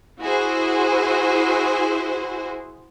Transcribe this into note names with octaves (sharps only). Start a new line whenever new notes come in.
E4 F#4 G#4 C5